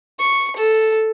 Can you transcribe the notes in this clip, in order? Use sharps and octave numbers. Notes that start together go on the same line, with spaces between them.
C#6
A4